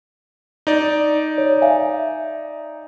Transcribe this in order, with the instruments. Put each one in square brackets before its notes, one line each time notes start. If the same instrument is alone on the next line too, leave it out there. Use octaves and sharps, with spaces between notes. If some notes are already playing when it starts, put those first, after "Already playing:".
[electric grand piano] D#4 D5
[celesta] C#5
E5 F5 G#5